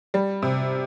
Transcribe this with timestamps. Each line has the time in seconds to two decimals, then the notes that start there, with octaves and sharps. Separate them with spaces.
0.14 G3
0.42 C3